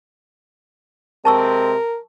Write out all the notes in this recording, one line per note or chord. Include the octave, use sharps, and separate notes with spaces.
C3 G#3 C4 A#4 A5 C#6 E6